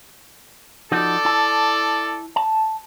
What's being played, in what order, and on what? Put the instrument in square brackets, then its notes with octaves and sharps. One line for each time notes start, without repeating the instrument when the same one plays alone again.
[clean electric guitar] F3 D#4 F#4 [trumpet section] A4 D5
[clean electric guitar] E4 A5
A5